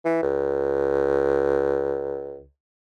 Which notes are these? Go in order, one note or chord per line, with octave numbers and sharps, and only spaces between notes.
E3
C#2